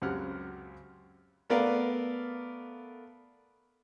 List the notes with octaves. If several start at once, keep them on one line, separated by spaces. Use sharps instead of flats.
C#2 F#2 C4 G4 F#5 F6
A3 B3 A#4 D5 F5